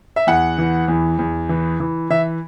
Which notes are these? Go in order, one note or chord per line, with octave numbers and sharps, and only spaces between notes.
E5
E2 F#5
E3
E2
E2
E3
E3
E3 E5